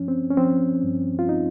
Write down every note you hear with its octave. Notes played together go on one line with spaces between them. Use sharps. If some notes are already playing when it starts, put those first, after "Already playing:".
Already playing: G2 F3 C#4
C4
C#4
F3 C4
G2
F4
D#4